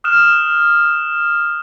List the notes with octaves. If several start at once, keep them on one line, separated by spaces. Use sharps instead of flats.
D#6 F6 F#6 E7